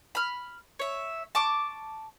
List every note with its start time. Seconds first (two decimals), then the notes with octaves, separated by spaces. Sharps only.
0.15 B5 F6
0.79 C#5 E5
1.35 A5 C#6 D6